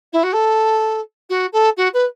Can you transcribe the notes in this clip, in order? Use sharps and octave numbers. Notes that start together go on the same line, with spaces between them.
E4
F#4
A4
F#4
A4
F#4
B4